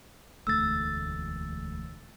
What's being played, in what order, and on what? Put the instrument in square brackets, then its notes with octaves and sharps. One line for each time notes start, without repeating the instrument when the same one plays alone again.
[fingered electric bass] E1 D2 A3 [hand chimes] E6 A6